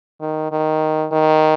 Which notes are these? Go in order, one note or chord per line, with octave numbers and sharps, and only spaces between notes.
D#3
D#3
D#3